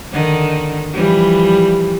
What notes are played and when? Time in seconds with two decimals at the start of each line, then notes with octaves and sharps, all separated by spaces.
0.13 D3 D#3 D#4
0.93 E3 F3 G3